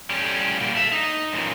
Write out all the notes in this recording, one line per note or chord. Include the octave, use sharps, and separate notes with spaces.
A2 G3 C#4 G4
A#2 G3 A#3
A3 E5
D#4
F#2 A#2 E3